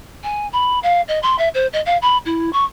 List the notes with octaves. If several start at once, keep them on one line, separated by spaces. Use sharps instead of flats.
G#5
B5
F5
D#5
C6
E5
C5
D#5
F5
B5
E4
C#6